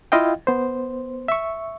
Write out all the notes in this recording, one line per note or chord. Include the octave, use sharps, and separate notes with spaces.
E4 F4 D#5 F5 G5
B3 C5
E5 C#6